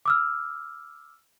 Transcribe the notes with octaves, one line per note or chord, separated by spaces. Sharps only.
D6 E6 F6